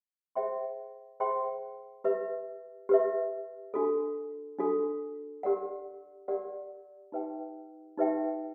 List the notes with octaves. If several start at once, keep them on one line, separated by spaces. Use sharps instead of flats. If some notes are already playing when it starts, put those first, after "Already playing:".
G#4 C5 E5 G5 C6
G#4 C5 E5 G5 C6
G4 B4 E5
G4 B4 E5
D4 F#4 A4
D4 F#4 A4
G4 A#4 D5 F#5
G4 A#4 D5 F#5
D#4 G4 B4 E5 G5
D#4 G4 B4 E5 G5